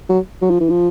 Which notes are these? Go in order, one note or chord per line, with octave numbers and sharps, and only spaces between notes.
F#3
F#3
F3
E3
F3